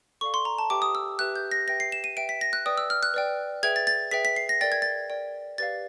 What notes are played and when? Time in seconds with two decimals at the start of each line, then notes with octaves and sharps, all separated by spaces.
0.21 A4 D5 F5 C#6
0.34 C6
0.45 A#5
0.58 A5
0.70 G4 B4 E5 G5 D6
0.82 D#6
0.95 E6
1.19 G4 B4 E5 G5 F#6
1.36 G6
1.52 A#6
1.68 B4 E5 G5 A#6
1.80 C7
1.92 E7
2.04 D#7
2.17 B4 E5 G5 D7
2.29 B6
2.41 A#6
2.53 F#6
2.66 B4 D5 G5 D#6
2.78 E6
2.90 F6
3.03 F#6
3.14 B4 D5 G5
3.63 G#4 B4 E5 G5 G#6
3.76 A6
3.87 A6
4.11 G#4 B4 E5 G5 B6
4.25 B6
4.36 C7
4.49 A#6
4.61 A#4 D5 G5 A6
4.72 G#6
4.82 A6
5.10 A#4 D5 G5
5.58 G4 B4 D5 F5 A6